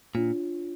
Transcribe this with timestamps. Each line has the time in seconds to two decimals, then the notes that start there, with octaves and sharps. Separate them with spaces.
0.14 A#2 D4 F4 C#5